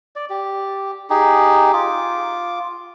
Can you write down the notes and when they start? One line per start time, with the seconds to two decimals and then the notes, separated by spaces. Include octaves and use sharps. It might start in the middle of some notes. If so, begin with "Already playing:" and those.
0.16 D5
0.30 G4
1.10 D#4 G4 G#4
1.73 F4 D6